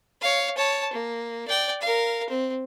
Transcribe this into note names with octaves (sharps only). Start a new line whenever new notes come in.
C#5 F5
C#5 A5
A#3
D5 G5
A#4 F5
C4